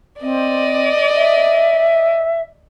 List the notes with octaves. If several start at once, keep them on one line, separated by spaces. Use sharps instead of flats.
C4 D5 D#5
E5